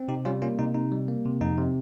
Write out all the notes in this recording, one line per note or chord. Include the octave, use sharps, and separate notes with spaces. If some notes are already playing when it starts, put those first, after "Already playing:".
Already playing: C4
C3 D#4 G4
G3 C#4 F4
A#3 C#4 F4
C3 D#4
C3 D#4
G3
A#3
C3
F2 D#4
C3